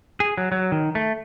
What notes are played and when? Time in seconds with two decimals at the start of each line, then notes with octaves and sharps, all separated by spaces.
0.20 G#4
0.38 F#3
0.52 F#3
0.72 D#3
0.95 A3